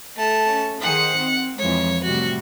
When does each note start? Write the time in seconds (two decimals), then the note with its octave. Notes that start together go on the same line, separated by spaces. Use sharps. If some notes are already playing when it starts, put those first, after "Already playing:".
0.16 A3 A5
0.46 C#4
0.82 D#3 G#4 C5 F#5 C#7
1.18 C4
1.58 F2 E3 G#3 C#5
2.04 A2 C3 G3 F#4